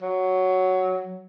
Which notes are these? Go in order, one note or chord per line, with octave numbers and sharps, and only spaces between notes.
F#3